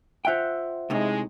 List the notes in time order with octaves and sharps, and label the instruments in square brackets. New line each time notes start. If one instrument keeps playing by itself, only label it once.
[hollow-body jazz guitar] F4 G5 [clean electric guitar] C5 E5 F#5
[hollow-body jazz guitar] A2 C3 D#4 [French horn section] G#3